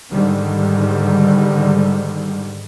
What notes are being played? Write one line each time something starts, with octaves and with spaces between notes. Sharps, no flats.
G#2 D3 D#3 G3